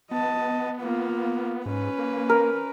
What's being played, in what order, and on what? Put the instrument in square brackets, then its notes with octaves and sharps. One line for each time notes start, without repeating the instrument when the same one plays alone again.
[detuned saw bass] B3 [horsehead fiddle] D#5 A5
[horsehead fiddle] A#3 F4
[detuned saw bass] G#2 [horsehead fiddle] C#4 B4
[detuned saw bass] A#3
[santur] A#4